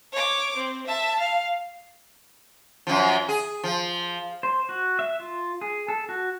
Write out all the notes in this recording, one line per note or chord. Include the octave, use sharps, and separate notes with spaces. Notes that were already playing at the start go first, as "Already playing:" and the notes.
C#5 D6
C4
E5 A5
F5
F#2 F3
G#4
F3
C5
F#4
E5
F4
G#4
A4
F#4